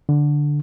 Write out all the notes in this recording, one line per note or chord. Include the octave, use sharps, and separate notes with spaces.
D3